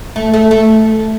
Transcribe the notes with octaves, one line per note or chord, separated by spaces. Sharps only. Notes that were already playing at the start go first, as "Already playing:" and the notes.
A3
A3
A3